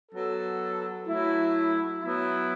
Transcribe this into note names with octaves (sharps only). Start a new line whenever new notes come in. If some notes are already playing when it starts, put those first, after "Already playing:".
F#3 B3 A4
F#3 A3 E4
F#3 B3 E4